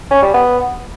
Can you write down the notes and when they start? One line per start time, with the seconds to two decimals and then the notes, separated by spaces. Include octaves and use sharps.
0.11 C#4
0.22 G3
0.34 B3